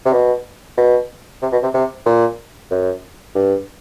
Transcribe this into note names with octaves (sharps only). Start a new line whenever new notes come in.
C3
B2
B2
C3
B2
C3
C3
A#2
F#2
G2